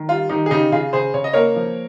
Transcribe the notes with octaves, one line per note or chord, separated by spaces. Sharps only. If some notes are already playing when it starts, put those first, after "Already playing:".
Already playing: D#3
G3 F4
D#3 D#4 G4
G#4
C#3 D#4 G4
C#3 F4 G#4
C#3 G#4 C5
C#3 C#5
D#5
A#3 A#4 C#5
F3